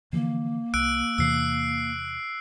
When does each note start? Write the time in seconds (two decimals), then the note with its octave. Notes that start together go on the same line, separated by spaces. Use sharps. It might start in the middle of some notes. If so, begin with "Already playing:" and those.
0.13 D3 E3 F3 A#3
0.74 C2 E6 F#6 D7
1.18 E2 C3 E3 E6 C7